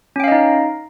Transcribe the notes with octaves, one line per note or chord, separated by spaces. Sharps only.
C#4 D#4 D#5 F5 G5